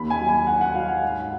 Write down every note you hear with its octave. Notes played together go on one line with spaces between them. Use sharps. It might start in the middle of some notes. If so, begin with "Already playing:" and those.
Already playing: D#2 B5
G#5
F#3
G#5
F#3 F#5
F#5
F#3 F5
F#5
G#2